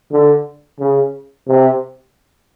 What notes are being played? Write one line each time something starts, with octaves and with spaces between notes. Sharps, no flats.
D3
C#3
C3